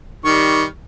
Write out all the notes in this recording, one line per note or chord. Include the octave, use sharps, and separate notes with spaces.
D#3 G3 C#6